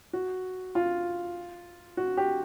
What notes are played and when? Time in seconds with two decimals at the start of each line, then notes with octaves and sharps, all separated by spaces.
0.13 F#4
0.75 F4
1.97 F#4
2.17 G4